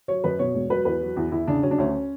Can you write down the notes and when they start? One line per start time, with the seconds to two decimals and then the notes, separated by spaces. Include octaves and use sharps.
0.08 F#3 C#5
0.24 F#2 B4
0.39 B2 C#5
0.55 E1
0.70 F#3 B4
0.85 E2 B4
1.01 F#3
1.16 E2
1.32 E2 E4
1.47 C#3 D4
1.63 F#3 C#4
1.71 D4
1.78 D2 C#4